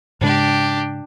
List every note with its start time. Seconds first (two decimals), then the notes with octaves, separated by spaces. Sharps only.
0.21 G#2 C#3 G#3 D4 G4